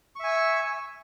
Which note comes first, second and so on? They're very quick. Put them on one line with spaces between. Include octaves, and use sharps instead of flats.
C#6 E5 G#5 E6